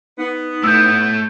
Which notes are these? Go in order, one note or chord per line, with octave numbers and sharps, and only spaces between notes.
B3 D#4
A2 A3 E6 G6